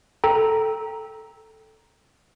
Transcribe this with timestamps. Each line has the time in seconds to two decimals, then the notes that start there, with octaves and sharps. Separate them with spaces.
0.24 A4 G5 A#5